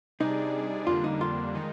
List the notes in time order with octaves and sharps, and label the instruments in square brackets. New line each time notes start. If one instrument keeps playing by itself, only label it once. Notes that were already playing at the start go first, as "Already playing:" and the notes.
[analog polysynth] C3 G3 D4 G#4 D5 [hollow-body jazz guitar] D#4
[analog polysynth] F2 D3 G3 A#3 D4 [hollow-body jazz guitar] F4
[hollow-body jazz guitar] D#4
F4
[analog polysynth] D#3 G#3 D#4